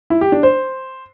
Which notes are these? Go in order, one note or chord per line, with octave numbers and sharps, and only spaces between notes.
E4
G4
D4
C5